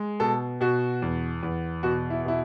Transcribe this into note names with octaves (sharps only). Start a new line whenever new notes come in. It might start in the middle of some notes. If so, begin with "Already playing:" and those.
Already playing: G#3
B2 A4
B2 F#4
E2
E2
B2 F#4
E4
B2 E4